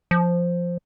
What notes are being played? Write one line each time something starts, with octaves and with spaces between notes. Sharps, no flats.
F3